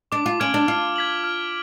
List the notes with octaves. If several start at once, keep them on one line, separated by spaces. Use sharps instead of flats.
D4 D6
F4
C#4 F6 G#6 D7 F#7
D4
F4 F6
G#6 B6 F#7
F6